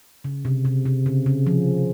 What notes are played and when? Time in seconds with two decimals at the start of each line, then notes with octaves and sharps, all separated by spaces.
0.24 C#3
0.45 C3
0.65 C3
0.85 C3
1.06 C#3
1.26 C#3
1.46 F3